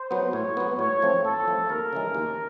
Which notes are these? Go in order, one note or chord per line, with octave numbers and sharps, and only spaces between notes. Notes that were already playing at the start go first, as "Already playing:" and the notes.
Already playing: C5
F#3 B3
A2 C#5
F#3 B3
A2 C#5
F3 A3 C4
A2 A4
F3 A3 C4
D#2 A#4
C#3 E3 G#3
D#2